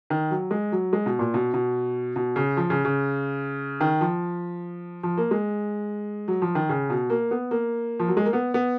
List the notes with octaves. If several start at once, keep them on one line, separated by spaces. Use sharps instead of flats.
D#3
F#3
G#3
F#3
G#3
B2
A#2
B2
B2
B2
C#3
F3
C#3
C#3
D#3
F3
F3
A#3
G#3
F#3
F3
D#3
C#3
B2
A#3
B3
A#3
F3
F#3
G#3
A#3
B3
B3